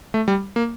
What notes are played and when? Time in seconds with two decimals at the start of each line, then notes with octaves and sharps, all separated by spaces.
0.14 A3
0.28 G3
0.56 A#3